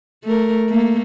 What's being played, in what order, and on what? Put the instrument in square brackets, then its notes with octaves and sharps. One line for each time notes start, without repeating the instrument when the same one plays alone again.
[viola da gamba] A3 A#4
A3 A#3